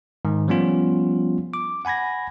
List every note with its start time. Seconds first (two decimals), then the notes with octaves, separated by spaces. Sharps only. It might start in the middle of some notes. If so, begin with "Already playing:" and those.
0.25 G#2 D#3
0.48 F3 G3 B3 C#4 F4
1.54 D6
1.85 F#5 G#5 B5 G#6 A#6